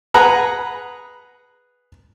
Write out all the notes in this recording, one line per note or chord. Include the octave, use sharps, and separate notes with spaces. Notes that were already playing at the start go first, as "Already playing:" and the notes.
G#4 B4 F#5 A#5 B5 F#6